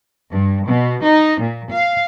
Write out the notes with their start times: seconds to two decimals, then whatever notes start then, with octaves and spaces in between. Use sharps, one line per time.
0.30 G2
0.66 B2
1.03 D#4
1.39 A#2
1.70 F5